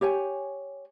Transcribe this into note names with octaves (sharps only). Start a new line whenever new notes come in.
G4 C#5 G5 G#5